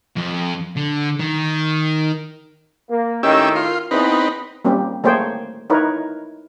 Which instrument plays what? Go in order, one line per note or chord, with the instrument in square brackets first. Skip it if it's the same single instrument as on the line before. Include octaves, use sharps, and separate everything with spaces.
[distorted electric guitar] F2
D3
D#3
[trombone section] A#3
[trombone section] A2 D#3 [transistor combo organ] C#4 G4 E6
[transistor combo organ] F4 C6
[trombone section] E2 [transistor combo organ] C4 D#4 B4
[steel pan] G3 A#3 C4 C#4 G4
A3 A#3 G#4 C5 C#5 G5
D#4 E4 A#4 B4 C#5